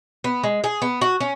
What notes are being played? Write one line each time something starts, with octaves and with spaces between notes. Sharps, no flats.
B3
G#3
G#4
B3
F#4
C#4